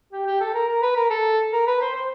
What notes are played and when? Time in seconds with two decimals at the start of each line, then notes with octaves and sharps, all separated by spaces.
0.13 G4
0.27 G4
0.41 A4
0.54 A#4
0.68 A#4
0.82 B4
0.96 A#4
1.10 A4
1.53 A#4
1.67 B4
1.81 C5
1.95 C5